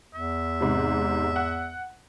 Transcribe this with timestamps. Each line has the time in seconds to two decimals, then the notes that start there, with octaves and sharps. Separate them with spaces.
0.14 E2 E5
0.61 G#2 C3
1.36 F#5